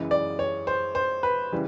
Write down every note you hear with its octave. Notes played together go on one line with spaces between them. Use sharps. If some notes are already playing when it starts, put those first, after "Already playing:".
Already playing: F#2 C#3 E3 G#3 D#5
D5
C#5
C5
C5
B4
C#3 E3 G3